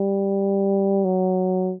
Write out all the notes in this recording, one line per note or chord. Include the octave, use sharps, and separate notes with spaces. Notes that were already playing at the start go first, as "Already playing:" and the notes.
Already playing: G3
F#3